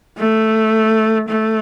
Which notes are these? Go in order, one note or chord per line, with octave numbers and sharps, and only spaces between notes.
A3
A3